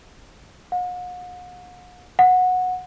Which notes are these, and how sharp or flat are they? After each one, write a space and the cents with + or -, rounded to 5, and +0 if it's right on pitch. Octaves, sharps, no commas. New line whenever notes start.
F#5 -45
F#5 -15